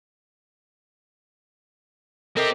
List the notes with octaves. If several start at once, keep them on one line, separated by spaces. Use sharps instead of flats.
C4 G4 A4 A#4 D#5